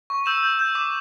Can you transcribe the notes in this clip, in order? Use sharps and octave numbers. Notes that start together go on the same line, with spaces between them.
C#6
E6 G6 E7
G6
G6
D6